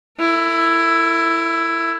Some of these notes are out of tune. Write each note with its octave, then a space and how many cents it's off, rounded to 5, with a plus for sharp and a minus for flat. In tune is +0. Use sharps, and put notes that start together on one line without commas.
E4 +10 A4 +40